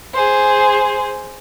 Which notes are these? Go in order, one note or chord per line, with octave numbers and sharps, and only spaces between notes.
G#4 C5